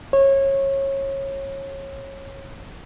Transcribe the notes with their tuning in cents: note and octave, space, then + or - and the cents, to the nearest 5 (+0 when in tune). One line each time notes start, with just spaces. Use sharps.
C#5 -25